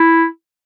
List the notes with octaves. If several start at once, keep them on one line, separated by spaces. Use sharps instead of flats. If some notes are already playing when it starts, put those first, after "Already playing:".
Already playing: E4